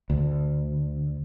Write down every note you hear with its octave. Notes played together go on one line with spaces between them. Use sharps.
D2